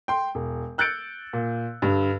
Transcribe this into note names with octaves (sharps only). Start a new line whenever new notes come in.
G5 C6
E1
E6 F#6 G6 A6 C#7 D7
A#2
G2 D3